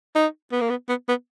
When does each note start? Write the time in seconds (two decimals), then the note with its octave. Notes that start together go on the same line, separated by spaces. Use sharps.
0.15 D#4
0.52 B3
0.61 A#3
0.69 B3
0.88 B3
1.08 B3